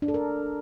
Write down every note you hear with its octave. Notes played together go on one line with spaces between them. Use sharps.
D4
A4
A#4